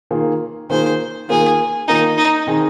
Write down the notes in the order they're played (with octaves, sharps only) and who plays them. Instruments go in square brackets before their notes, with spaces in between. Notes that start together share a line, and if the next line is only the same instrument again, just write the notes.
[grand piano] D#3 A#3 F4 G#4
[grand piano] D#3 A#3 F4 G#4 [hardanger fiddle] C5
[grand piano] D#3 A#3 F4 [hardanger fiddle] G#4
[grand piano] D#3 A#3 F4 [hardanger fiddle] D#4
[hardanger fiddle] D#4
[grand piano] D#3 C4 G#4